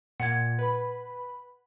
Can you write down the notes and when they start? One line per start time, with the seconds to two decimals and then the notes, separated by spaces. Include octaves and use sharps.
0.20 A#2 F#5 G#6
0.59 B4 B5